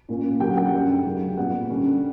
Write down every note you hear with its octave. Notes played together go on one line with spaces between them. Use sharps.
A#2 A#3 C#4
D3 F#3 A#3 C#4 G4 G5
F#5
G4 G5
F#5
F#2 D3 G3 C#4
C#3 F#3 C#4
A#2 G3 B3 F#5
D3 G3 C#4